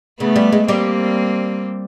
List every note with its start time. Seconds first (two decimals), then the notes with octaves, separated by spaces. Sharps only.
0.20 C#3 A3 B3
0.36 G3
0.52 G#3
0.68 G3 A#3 C4